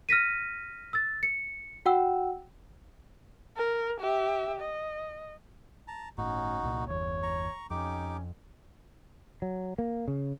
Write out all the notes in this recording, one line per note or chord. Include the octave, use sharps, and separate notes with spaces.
F6 A#6 B6 D#7
E6 A6
C#7
F#4 F#5 G5 E6
A#4
G4 E5
D#5
A5 A#5
G1 A2 C#4 D#4 F#4
C2 A#2
G1 E2 C#5
A#5 C#6
F2 C#4 D#4 G4 D6
F#3
A#3
C#3